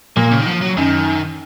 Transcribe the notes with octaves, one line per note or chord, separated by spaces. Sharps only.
A#2 A#3
C#3
D#3
F3
F#3
F#2 D#3